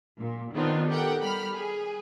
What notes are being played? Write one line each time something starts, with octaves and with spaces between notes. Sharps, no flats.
A#2
D#3 B3 C4 D4 D#4 F4
G4 A4 A#4 F#5 G5
G3 B5 F6
G#4